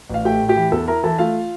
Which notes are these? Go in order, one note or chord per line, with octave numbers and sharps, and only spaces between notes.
A1 F5
A3 G4 G5
A2
G4 G5
E3
E2 A4 A5
E4 A#4 A#5
E3 A4 A5
A3 F4 F5